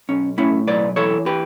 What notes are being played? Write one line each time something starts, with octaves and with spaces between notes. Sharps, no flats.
B1 C#4
A2 C#4 E4
B1 B4 D5
E3 A4 C#5
G4 B4